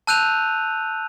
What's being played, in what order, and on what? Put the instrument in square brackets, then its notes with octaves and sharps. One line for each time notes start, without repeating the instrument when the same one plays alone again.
[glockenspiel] A5 E6 F#6 G6 D#7 F7